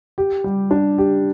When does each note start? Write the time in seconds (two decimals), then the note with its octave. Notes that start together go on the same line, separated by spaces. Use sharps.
0.18 G4
0.44 G3
0.71 D4
0.98 G4